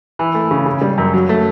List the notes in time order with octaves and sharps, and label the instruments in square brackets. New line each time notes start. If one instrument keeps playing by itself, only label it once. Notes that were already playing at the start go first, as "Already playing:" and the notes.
[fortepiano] E3
A3
C#3
C#3
G3
F#2
F#3
A3